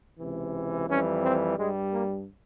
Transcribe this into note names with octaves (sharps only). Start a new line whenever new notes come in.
C#2 C3 E3
F2 E3 G3 C#4
C4
G2 G3 G#3
A#3